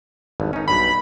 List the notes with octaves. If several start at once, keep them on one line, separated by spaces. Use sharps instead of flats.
G#1 G2
C#4 D#4
B1 G2 B5